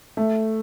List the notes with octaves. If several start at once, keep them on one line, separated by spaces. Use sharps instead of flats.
A3